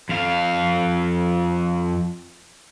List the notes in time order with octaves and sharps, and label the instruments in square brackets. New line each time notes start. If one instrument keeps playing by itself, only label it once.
[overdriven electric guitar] F2 F5